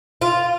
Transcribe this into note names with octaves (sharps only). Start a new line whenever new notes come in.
F4